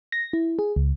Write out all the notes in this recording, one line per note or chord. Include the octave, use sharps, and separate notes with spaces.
A#6
E4
G#4
C#2